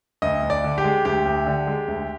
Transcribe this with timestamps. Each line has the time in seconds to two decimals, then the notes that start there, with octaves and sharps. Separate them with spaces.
0.22 D2 D#5
0.43 D2
0.50 D5
0.64 D3
0.78 G4
0.84 G#3
1.05 D2 G4
1.26 D2
1.47 D3
1.67 G#3
1.88 D2